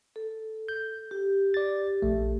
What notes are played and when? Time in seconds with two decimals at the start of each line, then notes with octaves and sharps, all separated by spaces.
0.16 A4
0.69 G6
1.11 G4
1.54 D5 A6
2.02 A#1 A3